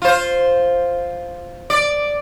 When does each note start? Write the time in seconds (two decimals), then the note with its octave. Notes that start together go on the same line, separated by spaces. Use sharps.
0.02 F4 C5
1.70 D5